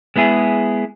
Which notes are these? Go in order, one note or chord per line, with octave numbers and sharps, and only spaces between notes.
G#3 B3 E4 G#4